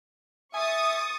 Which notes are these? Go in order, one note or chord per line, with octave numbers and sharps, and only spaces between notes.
E5 G#5 C#6 D#6 A6